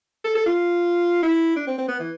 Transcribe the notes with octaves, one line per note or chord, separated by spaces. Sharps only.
A4
A4
F4
E4
D4
C4
C4
B3
E3